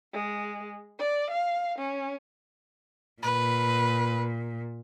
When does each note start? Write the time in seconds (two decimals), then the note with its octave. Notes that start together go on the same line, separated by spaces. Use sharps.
0.13 G#3
0.99 D5
1.30 F5
1.78 C#4
3.22 A#2 B4